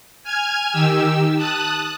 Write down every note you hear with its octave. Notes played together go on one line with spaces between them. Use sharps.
G#5 F6 G#6
D#3 G4 E6
A5 D#6 F#6